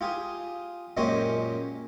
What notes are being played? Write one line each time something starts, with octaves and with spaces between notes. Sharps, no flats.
F4 G4 G#4
F#2 A#2 G#3 C#4 G4 C5